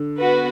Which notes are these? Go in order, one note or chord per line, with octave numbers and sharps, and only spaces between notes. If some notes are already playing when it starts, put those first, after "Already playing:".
Already playing: D3
B3 F#4 B4